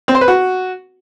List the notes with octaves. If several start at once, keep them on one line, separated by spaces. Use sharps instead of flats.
C4
C5
B4
F#4